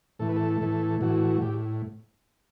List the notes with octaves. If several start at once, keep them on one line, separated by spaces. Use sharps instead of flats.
A2 E3 A3 A4
B4
A4
A2 E3 A3
A2 E3 A3 F#4
A2 G4